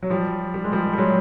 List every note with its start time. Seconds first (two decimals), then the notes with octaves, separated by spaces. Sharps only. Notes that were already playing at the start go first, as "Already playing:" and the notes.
0.03 F#3
0.10 F3 G3
0.54 G3
0.64 G#3
0.72 F3 G3
0.93 G3
0.98 F#3 G#3